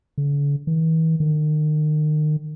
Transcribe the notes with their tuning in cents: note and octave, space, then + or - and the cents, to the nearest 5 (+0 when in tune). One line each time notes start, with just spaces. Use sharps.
D3 -45
E3 -40
D#3 -35